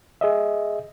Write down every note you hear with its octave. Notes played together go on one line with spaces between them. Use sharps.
G#4 D#5 E5